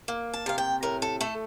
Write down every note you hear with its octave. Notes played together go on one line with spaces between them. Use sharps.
A#3
A5
C3 F5
G5
A2 A#4
A4
A3 A4